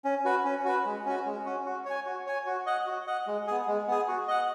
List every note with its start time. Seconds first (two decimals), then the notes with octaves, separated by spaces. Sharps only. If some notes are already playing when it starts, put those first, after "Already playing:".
0.05 C#4
0.25 F#4 B4
0.45 C#4
0.65 F#4 B4
0.85 G#3
1.06 C#4 F#4
1.26 G#3
1.46 C#4 F#4
1.66 F#4
1.85 C#5 G#5
2.06 F#4
2.26 C#5 G#5
2.46 F#4
2.66 D#5 F#5
2.87 F#4
3.07 D#5 F#5
3.27 G#3
3.47 B3 G#4
3.67 G#3
3.88 B3 G#4
4.08 F#4
4.28 D#5 F#5